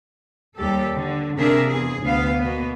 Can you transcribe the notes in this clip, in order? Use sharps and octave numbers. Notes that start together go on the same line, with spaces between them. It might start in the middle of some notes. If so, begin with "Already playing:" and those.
D#2 G3 G4 A4
D3
C3 A#3 D4 G#4 A#4 E5
E2 G#4
D2 B3 F5
B2 A#3 B3